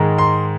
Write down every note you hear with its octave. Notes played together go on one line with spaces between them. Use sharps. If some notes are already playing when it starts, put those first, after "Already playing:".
Already playing: G#2 D#3 G#3
C6